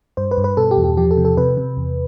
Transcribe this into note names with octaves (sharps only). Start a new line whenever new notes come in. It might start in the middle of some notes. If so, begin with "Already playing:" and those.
G2 C5
B4
G2
B4
B2 A4
G4
E2
G4
F3 G4
A4
C3
A4
C3 B4
C3
E2